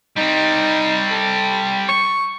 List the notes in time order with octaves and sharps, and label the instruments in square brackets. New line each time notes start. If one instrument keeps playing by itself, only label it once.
[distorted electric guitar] G3 C4 [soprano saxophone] D#4
[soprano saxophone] A4
C#6